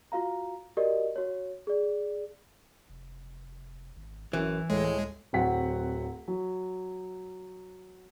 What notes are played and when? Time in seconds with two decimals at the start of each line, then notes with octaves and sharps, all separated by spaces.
0.12 F4 F#4 F5 A#5
0.77 F#4 G4 A#4 D5 D#5
1.16 F#4 C#5
1.67 G#4 D5
2.90 F1
3.96 G#1
4.33 A1 F#2 E3
4.70 C#2 A2 G#3
5.33 D1 F#3 C4 F#5 B6
6.28 F#3